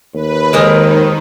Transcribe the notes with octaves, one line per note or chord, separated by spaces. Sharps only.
D#2 B4
F2 D#3 G#3 A#4